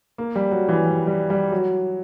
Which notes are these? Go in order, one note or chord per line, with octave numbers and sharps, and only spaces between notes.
A#3
G3
F#3
E3
G3
G3
G3
F#3